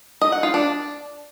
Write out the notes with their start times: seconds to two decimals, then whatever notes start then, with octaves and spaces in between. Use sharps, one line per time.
0.21 D#5
0.32 F#5
0.43 F4
0.54 D4